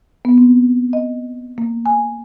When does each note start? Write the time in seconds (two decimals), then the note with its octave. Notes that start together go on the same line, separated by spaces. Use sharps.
0.25 B3
0.38 C4
0.93 D#5
1.58 A#3
1.86 G#5